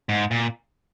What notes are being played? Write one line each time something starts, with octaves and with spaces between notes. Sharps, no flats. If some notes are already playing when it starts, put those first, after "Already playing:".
G#2
A#2